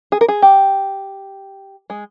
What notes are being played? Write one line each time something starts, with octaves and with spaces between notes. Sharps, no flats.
G#4
A#4
G#4
G4
G#3